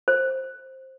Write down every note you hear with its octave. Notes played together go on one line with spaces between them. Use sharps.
C5